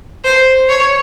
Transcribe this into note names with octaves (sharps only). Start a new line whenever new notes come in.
C5
C#5